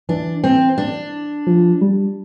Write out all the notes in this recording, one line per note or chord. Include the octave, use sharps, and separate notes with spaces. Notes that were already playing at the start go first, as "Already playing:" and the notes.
E3 D4
C4
D4
F3
G3